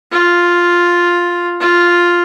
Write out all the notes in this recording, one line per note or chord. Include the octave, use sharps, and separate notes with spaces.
F4
F4